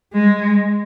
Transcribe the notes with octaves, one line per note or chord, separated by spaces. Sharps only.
G#3